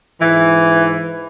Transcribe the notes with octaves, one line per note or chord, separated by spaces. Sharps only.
G#2 E3